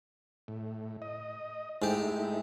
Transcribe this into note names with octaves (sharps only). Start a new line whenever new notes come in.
A2
D#5
G#2 A3 D#4 E4 G4